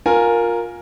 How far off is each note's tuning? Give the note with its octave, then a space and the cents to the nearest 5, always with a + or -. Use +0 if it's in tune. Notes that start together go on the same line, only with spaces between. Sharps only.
F4 +20 A#4 +0 G#5 +0